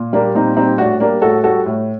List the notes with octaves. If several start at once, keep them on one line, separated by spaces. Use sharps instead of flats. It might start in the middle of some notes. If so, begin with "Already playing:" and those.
Already playing: A#2
G3 A#3 D4
A#2 C4 D#4
G3 C4 D#4
A2 D4 F#4
G3 A#3 D4
A2 F#4 A4
G3 F#4 A4
A2